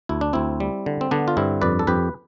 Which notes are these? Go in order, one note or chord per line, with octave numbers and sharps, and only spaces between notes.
D2 E4
D4
D2 C4 E4
G3
D3
C4
D3 B3 D4
F4
G2 C4 E4
F2 B4 D5
A4
F2 G4 B4